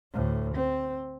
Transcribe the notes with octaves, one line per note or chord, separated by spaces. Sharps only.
D2 A2
C4